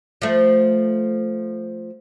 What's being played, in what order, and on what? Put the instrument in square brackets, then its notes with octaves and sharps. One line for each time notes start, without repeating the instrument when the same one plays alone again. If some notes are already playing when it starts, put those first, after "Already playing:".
[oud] F3 A3